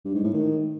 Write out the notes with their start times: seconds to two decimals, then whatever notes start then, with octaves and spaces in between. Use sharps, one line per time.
0.05 G2
0.14 G#2
0.24 A2
0.34 D#3